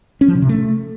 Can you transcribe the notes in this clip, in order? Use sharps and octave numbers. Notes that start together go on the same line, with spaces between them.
C#4
F3
B2
C3
A3